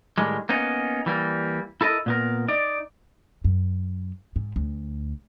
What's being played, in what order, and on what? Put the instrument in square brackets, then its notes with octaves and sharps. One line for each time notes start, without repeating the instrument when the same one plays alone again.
[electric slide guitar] A2 D#3 G3 G#3
A#3 B3 C#4 D#4
E3 G3 A#3
E4 A4 A#4 D#5
A#2 B3 A#4
D#4 D5
[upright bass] F#2
G#2
D2